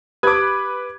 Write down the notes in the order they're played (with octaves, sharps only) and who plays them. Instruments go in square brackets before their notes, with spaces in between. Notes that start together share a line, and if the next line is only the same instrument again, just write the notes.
[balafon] G4 [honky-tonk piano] B4 B5 [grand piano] D6 G#6